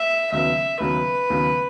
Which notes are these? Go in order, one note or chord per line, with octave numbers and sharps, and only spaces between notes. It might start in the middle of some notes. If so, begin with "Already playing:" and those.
Already playing: E5
D#2 C#3 F#3 B3 E5
D#2 C#3 F#3 B3 B4
D#2 C#3 F#3 B3